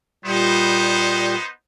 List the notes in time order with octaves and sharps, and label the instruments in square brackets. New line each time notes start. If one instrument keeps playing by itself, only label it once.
[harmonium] A#2 G3 [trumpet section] B3 D#4 C5